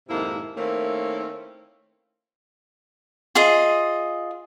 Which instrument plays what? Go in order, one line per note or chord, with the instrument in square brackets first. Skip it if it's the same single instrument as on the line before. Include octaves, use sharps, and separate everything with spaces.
[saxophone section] F2 G#2 C3 D#3 A#3 E4
D#3 A3 A#3 C4 C#4 E4
[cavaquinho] F4 G#4 D#5